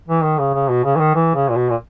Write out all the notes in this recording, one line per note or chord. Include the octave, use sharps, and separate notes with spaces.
E3
D#3
C#3
C#3
B2
C#3
E3
D#3
E3
C#3
A#2
B2
A#2